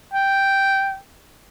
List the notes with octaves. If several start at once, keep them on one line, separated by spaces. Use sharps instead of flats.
G5